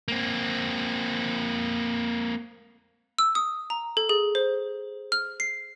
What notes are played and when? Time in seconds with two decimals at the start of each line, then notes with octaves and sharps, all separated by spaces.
0.08 A#3 C4
3.19 E6
3.35 D#6
3.70 A#5
3.97 A4
4.09 G#4
4.35 C5
5.12 F6
5.40 C7